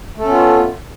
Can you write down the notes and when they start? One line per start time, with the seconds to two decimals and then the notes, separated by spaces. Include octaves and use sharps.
0.17 A3
0.20 A4
0.24 C#4
0.27 B3
0.31 F4